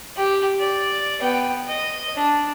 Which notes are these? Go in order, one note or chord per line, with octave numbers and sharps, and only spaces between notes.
G4
D5
B3 G5
D#5
D4